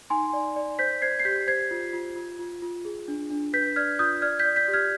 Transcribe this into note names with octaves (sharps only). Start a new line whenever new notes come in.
D#4 G#5 C6
D5
D5
C5 G6 B6
C5 G#6 C7
C7
G4 G6 B6
C5 G#6 C7
F4
F4
F4
F4
F4
G#4
D4
D4
B4 G6 B6
D5 F6 G#6
F4 D#6 G6
D5 F6 G#6
G6 B6
D5
G6 B6
G4
F6 G#6